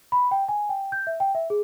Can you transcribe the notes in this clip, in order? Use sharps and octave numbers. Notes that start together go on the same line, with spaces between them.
B5
G5
G#5
G5
G6
E5
G5
E5
G#4